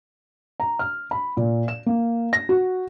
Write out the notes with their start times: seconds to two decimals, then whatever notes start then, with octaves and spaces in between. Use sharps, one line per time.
0.60 A#5
0.79 F6
1.11 B5
1.37 A#2
1.68 E7
1.86 A#3
2.33 A#6
2.49 F#4